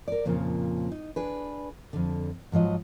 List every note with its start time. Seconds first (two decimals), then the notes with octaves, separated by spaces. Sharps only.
0.08 A#4 D5
0.25 F2 A#2 C#3 F3 A#3
0.92 D#4
1.16 D4 G#4 B4
1.93 F2 D3
2.52 G#2 F3 F#3 D#5